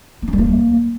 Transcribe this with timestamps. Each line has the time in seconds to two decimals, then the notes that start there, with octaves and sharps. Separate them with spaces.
0.22 B3
0.28 C#4
0.33 G3
0.38 A#3